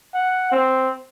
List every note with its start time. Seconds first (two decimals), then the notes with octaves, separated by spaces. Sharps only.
0.14 F#5
0.52 C4